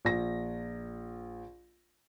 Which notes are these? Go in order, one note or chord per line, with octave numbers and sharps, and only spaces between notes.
A#1 A#6